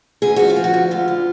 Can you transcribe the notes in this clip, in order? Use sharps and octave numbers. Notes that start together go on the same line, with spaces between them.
D2 G#4
F3 F#4
F4
F3
F#4
D2
D2 F4
D3